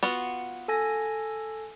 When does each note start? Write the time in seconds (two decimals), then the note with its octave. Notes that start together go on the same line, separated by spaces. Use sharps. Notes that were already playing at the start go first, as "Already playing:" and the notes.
0.03 B3 F4 F#4
0.68 A4 G#5 A#6